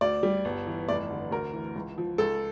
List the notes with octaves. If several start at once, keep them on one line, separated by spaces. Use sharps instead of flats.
D2 D5
G3
G1
E3
F1 D5
D3
D2 A#4
E3
C#2
F3
C#2 A4